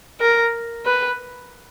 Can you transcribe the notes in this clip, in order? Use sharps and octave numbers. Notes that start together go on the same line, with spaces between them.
A#4
B4